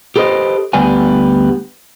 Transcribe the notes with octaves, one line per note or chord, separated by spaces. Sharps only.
G4 A4 B4 C5 D#5
D2 G3 B3 G#5